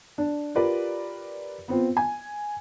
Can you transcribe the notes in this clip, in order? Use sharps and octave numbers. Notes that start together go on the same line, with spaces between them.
D4
F4 G4 A#4 B4 D5
B3 C4 F4
G#5